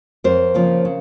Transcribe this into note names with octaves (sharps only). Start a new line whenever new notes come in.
F2 A#4 C5
C#3 F3 A#3 C#4
C#3